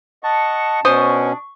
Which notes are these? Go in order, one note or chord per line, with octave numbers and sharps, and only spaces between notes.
D#5 F#5 A5 C#6
B2 C#4 D4 C5 C#6 D#6